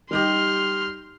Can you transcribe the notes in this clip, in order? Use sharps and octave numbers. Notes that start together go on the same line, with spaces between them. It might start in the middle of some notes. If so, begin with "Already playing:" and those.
G3 D#4 G4 C6 F6